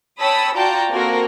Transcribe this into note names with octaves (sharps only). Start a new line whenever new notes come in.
C#5 G5 A5 B5 D#6 E6
F4 F#4 D5 G5 A5 A#5
A#3 C4 F#4 A4 A#4